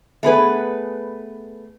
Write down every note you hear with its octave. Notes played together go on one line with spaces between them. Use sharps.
A3 B3 G#4 B4